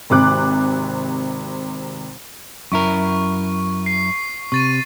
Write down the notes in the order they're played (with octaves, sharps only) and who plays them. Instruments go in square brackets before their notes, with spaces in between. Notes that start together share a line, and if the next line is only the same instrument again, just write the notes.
[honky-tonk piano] G#1 C3 D6 F#6
[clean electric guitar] F#2 E4 A#4 [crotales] C#6
[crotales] C7
[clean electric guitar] C3 [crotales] C#6 A6 D#7